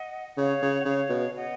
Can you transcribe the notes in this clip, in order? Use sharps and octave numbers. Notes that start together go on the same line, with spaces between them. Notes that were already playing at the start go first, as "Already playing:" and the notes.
Already playing: D#5 F#5
C#3 C#5 F5
C#3
F#5
C#3 C#5 F5
B2
D#5 F#5